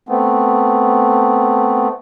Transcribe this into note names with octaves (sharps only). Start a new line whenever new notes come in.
A3 B3 C4